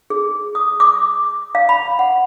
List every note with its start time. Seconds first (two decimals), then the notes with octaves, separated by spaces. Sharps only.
0.10 G#4
0.55 D#6
0.80 D6
1.55 F5
1.69 B5
1.99 F#5